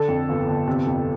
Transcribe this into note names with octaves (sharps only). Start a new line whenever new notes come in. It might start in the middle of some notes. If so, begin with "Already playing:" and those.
Already playing: D3 A4
F2
G1
G1
C3
F2